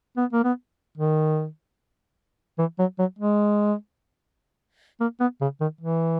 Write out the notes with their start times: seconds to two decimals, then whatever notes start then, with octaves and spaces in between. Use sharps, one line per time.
0.17 B3
0.33 A#3
0.44 B3
0.98 D#3
2.59 E3
2.79 F#3
2.99 F#3
3.19 G#3
5.00 A#3
5.20 B3
5.41 C#3
5.61 D#3
5.81 E3